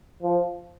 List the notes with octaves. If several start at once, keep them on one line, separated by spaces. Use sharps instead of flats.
F3